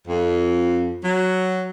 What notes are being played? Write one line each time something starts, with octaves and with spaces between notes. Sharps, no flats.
F2
F#3